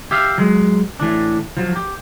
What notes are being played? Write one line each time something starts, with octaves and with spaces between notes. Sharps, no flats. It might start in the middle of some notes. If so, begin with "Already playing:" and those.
G4 E5 F5
F#3 G#3
A2 E3 D4
F3 F#3
G4